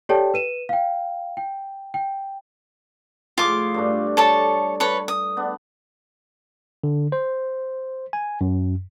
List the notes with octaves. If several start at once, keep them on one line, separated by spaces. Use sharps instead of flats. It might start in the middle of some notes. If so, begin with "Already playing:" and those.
G4 A4 C#5 D5 G5 A5
B4 D#7 E7
F5 G5
G5
G5
A2 F3 F4 G#4 D6
G2 A3 D4
A4 C#5 A5
A4 B4 C#5
D#6
B3 D4
D3
C5
G#5
F#2